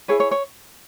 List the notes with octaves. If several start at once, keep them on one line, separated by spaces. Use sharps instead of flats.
E4 G#4 B4 C#5
C#5
C#5